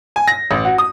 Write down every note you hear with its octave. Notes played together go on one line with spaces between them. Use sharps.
G#5
A#6
A1
F#4
D#6